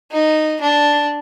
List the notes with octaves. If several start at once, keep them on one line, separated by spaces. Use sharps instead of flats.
D#4
D4